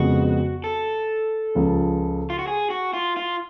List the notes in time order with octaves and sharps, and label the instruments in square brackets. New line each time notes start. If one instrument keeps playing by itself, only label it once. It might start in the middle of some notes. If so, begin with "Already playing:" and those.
Already playing: [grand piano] F2 C#3 G#3 B3 [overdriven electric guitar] F#4
[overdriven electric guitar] A4
[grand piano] C#2 C#3 F3
[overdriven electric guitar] F4
F#4
G#4
F#4
F4
F4